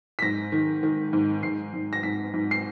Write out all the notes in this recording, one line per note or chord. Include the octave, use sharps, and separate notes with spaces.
B6
G#2 A#6
D#3
D#3
G#2
G#2 C7
G#2
A#6
G#2 B6
G#2
C7